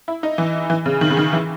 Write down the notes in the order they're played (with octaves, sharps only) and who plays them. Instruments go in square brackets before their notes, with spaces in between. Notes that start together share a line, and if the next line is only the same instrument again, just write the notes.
[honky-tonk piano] E4
D#4
E3
E3
C#3
D#3
C#3
D#3
E3